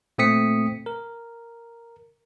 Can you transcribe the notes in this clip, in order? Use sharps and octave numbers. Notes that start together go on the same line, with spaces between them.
A#2 A3 C4 D#6 B6 C#7
A#4